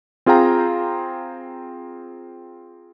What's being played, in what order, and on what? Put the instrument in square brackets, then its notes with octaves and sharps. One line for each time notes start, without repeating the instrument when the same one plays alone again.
[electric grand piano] C4 F4 G#4 F5 G5 A#5